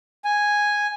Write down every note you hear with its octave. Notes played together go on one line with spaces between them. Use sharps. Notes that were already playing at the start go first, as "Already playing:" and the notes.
G#5